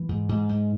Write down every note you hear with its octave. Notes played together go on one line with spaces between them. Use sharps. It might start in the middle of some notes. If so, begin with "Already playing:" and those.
Already playing: E3
G#2
G#2
G#2